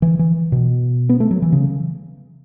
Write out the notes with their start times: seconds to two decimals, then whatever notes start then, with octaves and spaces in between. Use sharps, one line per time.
0.02 E3
0.19 E3
0.52 B2
1.09 B3
1.20 A3
1.31 F#3
1.42 E3
1.52 C#3